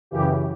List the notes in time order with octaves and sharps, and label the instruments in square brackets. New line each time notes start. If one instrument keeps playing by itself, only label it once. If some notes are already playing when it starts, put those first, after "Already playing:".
[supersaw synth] F#2 C#3 E3 G4